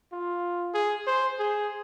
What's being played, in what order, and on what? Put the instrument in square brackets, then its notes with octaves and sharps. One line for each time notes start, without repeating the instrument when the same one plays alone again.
[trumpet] F4
G#4
C5
G#4